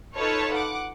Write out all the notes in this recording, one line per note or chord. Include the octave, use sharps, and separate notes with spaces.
D#4 F4 A4 B4 C#5 A5
F#5 D6